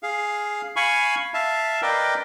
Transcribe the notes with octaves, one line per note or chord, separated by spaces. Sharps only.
G#4 F5
F5 G#5 B5 C#6
E5 F5 A5
A#4 B4 D5 D#5 G5